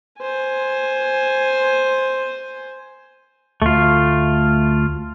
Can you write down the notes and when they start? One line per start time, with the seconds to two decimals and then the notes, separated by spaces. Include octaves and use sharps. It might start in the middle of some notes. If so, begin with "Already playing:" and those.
0.20 C5 G#5
3.62 D2 A3 F4